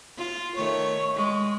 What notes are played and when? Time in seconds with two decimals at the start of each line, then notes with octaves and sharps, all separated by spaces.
0.17 F4
0.56 D#3 A3 C#5 C#6
1.15 G#3